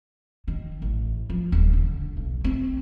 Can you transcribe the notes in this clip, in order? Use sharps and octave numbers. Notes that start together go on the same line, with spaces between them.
D#3
A1
F3
D#1
D3
B1
C4